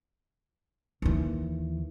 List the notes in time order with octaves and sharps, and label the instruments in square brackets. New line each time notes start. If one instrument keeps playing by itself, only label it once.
[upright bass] D#2 E3